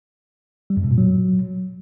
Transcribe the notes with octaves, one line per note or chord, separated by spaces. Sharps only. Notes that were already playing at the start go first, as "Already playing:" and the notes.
G3
F#2
B2
A#2
F#3